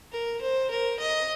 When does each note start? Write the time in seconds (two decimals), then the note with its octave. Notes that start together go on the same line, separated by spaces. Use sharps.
0.12 A#4
0.41 C5
0.70 A#4
0.99 D#5